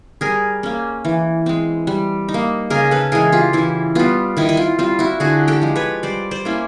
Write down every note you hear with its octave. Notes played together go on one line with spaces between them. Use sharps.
G3 G#4 A#4
A#3 C#4
E3
G#3 C4
G3
D#4
A#3
C#3 G#4 A#4
A4 B4
E3 G#3 G#4 A#4
F4 G4
E3 E4
G3 B3 F4
D#3 E4
E4
F4
G3 C4 F4
E4 F#4
D3 F#4 G#4
G4 A4
F3 G#3
B4 C#5
G3 C5 D5
C5 D5
A#3 C#4 E4